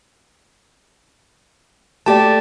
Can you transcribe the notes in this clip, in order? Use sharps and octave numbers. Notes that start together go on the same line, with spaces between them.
A3 G4 D5 A5